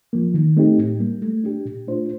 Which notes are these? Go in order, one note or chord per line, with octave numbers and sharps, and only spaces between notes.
F3 A#3
D#3
A3 C4 D#4 G4
A2
G3 A#3
A3
D4 G4
A#2
A3 D4 F4 C5